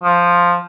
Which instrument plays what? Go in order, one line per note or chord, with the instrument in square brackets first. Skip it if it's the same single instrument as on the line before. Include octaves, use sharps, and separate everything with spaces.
[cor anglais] F3